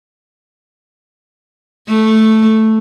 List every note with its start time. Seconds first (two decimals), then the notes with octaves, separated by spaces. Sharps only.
1.88 A3